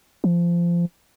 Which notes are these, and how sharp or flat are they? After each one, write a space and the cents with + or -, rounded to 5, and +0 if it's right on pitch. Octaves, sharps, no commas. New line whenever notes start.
F3 -20